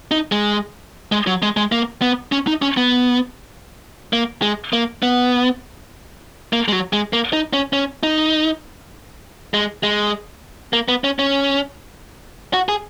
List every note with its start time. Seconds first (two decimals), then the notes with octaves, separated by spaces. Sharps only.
0.11 D#4
0.32 G#3
1.12 G#3
1.27 F#3
1.43 G#3
1.57 G#3
1.72 A#3
2.02 B3
2.32 C#4
2.47 D#4
2.62 C#4
2.77 B3
4.13 A#3
4.42 G#3
4.73 A#3
5.03 B3
6.53 A#3
6.68 G#3
6.72 F#3
6.93 G#3
7.13 A#3
7.33 D#4
7.53 C#4
7.73 C#4
8.03 D#4
9.54 G#3
9.83 G#3
10.73 A#3
10.88 B3
11.04 C#4
11.19 C#4
12.54 F#4
12.69 G#4